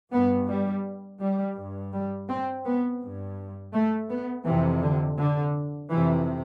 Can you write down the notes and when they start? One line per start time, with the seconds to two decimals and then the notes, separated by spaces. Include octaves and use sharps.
0.12 G2 B3
0.49 G3
1.20 G3
1.57 G2
1.93 G3
2.29 C4
2.66 B3
3.01 G2
3.73 A3
4.10 B3
4.45 F2 C3 E3
4.82 D3
5.19 D3
5.90 F2 C3 E3